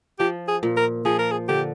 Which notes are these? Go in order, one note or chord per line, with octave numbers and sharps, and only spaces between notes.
F3 G4
G#4
A#2
A#4
F3 G#4
A#4
G#4
D3 G4